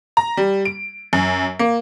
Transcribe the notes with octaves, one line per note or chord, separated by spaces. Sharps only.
A#5
G3
D7
F#2
A#3